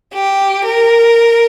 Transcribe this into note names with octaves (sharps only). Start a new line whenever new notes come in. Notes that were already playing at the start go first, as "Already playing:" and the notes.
G4
A#4